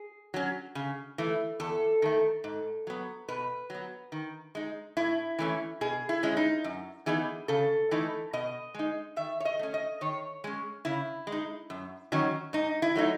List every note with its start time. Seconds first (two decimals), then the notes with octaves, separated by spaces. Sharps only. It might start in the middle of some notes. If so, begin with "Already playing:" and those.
Already playing: G#4
0.34 F#3 C#4
0.75 C#3
1.18 E3 A3
1.60 E2 A4
2.02 D#3 A3
2.44 G#2
2.87 F#3 B3
3.28 B2 B4
3.70 F#3 B3
4.12 D#3
4.55 G#3 D#4
4.97 A2 E4
5.39 E3 A3 C#4
5.81 B2 G#4
6.09 E4
6.23 G#3 C#4
6.37 D#4
6.64 F#2
7.06 E3 B3 D#4 G#4
7.48 C#3 A4
7.91 E3 A3 D#4
8.33 B2 D#5
8.74 G#3 D#4
9.16 D#3 E5
9.40 C#5
9.45 D#5
9.59 A3 C#4
9.74 D#5
10.01 D#3 C#5
10.44 G#3 C#4
10.85 C#3 E4
11.27 G#3
11.32 D#4
11.70 F#2
12.12 D#3 F#3 C#4
12.53 G#2 D#4
12.82 E4
12.95 F#3 A3 D#4